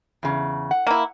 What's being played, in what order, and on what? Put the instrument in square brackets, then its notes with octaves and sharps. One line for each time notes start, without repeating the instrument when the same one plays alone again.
[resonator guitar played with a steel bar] E2 C#3
F#5
[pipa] A#3 E4